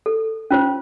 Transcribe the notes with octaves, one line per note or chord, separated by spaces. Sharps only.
A4
C#4 F4 C5